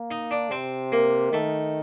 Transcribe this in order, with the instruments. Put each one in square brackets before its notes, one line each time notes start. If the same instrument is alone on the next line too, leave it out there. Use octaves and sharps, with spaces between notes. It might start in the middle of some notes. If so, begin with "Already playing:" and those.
Already playing: [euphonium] A#3
[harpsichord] D#4
D4
[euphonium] C3 [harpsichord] C4
[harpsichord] A#3
[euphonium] D#3 [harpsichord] A3